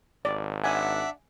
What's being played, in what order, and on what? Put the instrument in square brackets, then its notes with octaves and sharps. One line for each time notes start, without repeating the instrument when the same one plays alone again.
[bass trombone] G#1 [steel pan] D5
[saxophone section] D4 D5 F#5 [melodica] E5 [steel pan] G#5